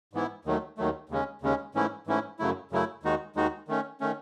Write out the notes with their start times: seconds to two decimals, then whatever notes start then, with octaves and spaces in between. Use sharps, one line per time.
0.13 G#2 E3 B3 E4
0.45 D#2 D#3 F#3 A3
0.78 D#2 D#3 F#3 A3
1.09 D#2 C#3 G#3 C#4
1.42 D#2 C#3 G#3 C#4
1.75 G#2 E3 A3 C#4 E4
2.07 G#2 E3 A3 C#4 E4
2.39 F#2 C#3 F#3 A3 E4
2.71 F#2 C#3 F#3 A3 E4
3.03 D#2 D#3 G#3 D#4 F#4
3.36 D#2 D#3 G#3 D#4 F#4
3.68 D#3 A3 C#4
4.00 D#3 A3 C#4